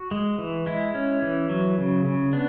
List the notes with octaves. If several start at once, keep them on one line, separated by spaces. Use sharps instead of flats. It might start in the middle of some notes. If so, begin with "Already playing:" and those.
Already playing: F#4
G#3
E3
G#3 E4
C#4
E3
F#3
C#3
C#3
B3 D4